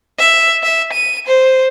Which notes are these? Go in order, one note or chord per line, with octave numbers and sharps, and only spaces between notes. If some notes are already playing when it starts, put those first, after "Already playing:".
E5
E5
D#7
C5